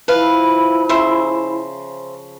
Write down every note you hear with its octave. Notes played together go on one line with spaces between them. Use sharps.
F3 E4 B4 F5
C#3 C5 E5